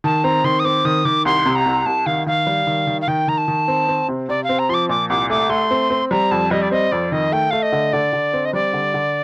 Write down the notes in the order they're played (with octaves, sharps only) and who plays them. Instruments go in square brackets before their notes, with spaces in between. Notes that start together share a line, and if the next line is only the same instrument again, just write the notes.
[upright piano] D#3 [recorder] A5
[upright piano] C4 [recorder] A#5
[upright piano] D#3 [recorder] C6
[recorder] D#6
[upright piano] C4 [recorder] D6
[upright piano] D#3 [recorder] D#6
[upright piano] D#3 [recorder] D6
[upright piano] C2 [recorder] C6
[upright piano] C3
[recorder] A#5
[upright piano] C2
[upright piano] C2 [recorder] A5
[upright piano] D#3 [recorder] F5
[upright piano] D#3 [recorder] F5
[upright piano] G3
D#3
D#3
[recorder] F5
[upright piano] D#3 [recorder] G5
[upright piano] D#3 [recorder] A#5
[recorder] A5
[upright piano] D#3
C4
C4
C3
[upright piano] C3 [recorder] D5
[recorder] F5
[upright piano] C4
[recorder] A#5
[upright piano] F3 [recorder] C6
[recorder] D6
[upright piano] A#2 [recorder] D6
[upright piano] C2 [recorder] D6
[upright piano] A3 [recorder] D6
[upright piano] A3 [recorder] C6
[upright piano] C4
C4
[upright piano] G3 [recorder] A#5
[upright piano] F2 [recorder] A5
[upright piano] G3 [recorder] D#5
[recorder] D5
[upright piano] C4 [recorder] D#5
[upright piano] F2 [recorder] D5
[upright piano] D#3 [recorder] D#5
[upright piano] A3 [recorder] G5
[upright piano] A3 [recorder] F5
[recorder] D#5
[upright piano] D3
[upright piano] D3 [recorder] D5
[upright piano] D3
C4
[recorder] D#5
[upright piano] G3 [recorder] D5
[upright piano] D3
D3